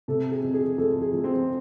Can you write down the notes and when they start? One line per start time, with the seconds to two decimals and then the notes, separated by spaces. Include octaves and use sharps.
0.08 C3 A4
0.31 G#4
0.43 F2
0.54 G#4
0.78 F2 A4
1.01 G#4
1.13 F3
1.24 C4